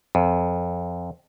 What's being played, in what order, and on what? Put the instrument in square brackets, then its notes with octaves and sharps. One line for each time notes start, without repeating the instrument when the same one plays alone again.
[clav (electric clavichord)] F2